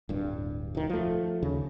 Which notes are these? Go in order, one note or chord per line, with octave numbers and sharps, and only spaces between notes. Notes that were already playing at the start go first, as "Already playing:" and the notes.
D1 G2
E1 D#3
F3 A3
D#2 C#3